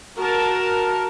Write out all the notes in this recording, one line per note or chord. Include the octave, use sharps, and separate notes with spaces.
F#4 A#4 A5